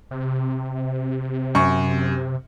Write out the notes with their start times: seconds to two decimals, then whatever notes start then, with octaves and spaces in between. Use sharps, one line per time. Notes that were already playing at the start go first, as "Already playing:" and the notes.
0.11 C3
1.55 F#2 C#6